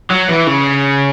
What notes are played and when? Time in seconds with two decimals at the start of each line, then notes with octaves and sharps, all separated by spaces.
0.10 F#3
0.28 E3
0.47 C#3